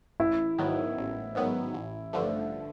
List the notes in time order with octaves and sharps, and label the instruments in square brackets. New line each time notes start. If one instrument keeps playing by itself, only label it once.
[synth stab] A1 [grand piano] E4
[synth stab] G#2 D#3 F#3 B3
A1
G#2 D#3 F#3 B3
A1
G2 D3 F3 A3